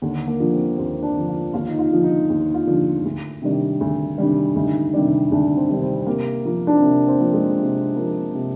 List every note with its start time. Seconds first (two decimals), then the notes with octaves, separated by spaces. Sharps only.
0.02 D#2 D3
0.27 A#3
0.40 D3 F3
0.53 C4
0.78 D#2 C4
1.03 D4
1.16 D3 F3
1.28 F4
1.54 D#2 F4
1.69 D#4
1.79 F4
1.91 D3 F3
2.04 D#4
2.30 D#2
2.54 F4
2.67 D3 F3
3.05 D2
3.42 C3 D#3 G3 D4
3.81 D2
4.18 C3 D#3 G3 D4
4.55 D2 D#4
4.94 C3 D#3 G3 D4
5.32 D2 D4
5.57 C4
5.68 C3 D#3 G3 D4
5.82 C4
6.07 C3 A#3
6.45 F3 A#3
6.67 D4
6.75 C4
6.82 C3 A#3
7.08 C4
7.20 F3 A#3
7.33 G#3
7.58 C3
7.96 F3 A#3
8.34 C3